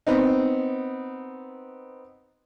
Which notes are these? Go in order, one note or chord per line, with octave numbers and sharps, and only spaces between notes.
B3 C4 D#4